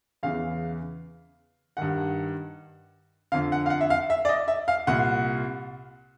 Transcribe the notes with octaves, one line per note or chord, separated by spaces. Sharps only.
E2 C#3 E3 F5
G2 D#3 F#5
F2 D3 F5
F#5
F5
F#5
E5
F5
E5
D5
D#5
E5
F5
C2 A#2 F#5